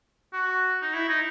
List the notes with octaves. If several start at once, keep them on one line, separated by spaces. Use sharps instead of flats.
F#4
D#4
E4
D#4